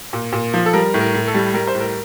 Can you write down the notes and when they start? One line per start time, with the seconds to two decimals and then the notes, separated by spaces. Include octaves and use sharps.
0.13 A#2
0.33 A#2
0.54 F3
0.66 A4
0.73 G3 A#4
0.94 A2
1.00 A#4
1.14 A2
1.27 A4
1.34 G3
1.54 G3 A#4
1.67 C5
1.75 A2
1.80 A#4